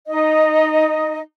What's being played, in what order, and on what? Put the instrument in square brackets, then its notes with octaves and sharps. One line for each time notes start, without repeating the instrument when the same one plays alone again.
[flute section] D#4 D#5